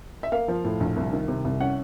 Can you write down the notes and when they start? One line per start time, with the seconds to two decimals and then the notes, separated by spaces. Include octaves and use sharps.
0.23 E5
0.32 A#3 F5
0.48 F3
0.64 A2
0.80 A#1
0.96 C2
1.13 D#3
1.28 C3
1.44 C2
1.60 C#4 F#5